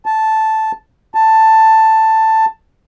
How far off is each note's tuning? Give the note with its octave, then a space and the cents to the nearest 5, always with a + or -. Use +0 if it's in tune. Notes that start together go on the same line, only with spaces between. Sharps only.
A5 -5
A5 +10